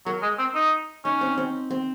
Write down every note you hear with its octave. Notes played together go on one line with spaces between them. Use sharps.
F#3 A#4
G#3
C4
D#4
C#4 D#4
C4
C4
C4